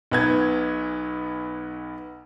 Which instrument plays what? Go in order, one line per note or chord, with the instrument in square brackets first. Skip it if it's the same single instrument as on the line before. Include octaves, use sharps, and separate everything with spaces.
[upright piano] B1 B3 G#6